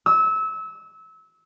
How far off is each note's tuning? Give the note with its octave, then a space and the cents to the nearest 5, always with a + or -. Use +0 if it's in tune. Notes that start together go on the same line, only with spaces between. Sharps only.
E6 -25